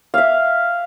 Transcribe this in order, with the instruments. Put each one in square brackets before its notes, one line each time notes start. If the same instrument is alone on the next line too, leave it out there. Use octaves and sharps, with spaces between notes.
[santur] E5 F5